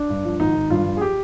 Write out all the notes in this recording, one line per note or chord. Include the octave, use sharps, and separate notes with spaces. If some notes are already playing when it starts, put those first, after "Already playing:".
Already playing: D4
G2
F3
G#1 D#4
G#1
G2 F4
F3
G#4
G4